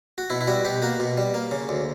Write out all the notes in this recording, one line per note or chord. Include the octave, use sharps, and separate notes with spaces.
F#4
B2 E4
E4
G3 F#4
B2 G4
A#3 F#4
B2
G3
A#3
C#3
D2